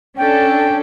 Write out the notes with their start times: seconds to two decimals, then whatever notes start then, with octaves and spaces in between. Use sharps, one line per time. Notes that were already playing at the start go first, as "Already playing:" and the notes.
0.17 C#4 D4 A4 G5